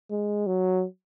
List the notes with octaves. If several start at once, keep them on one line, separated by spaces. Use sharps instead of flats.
G#3
F#3